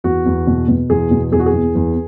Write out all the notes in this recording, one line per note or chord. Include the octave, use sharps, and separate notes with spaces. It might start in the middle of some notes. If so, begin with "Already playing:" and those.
E2 F#4
E2
B2
B2
E2 G#4
B2
E2 G#4
F#4
G#4
E2
E2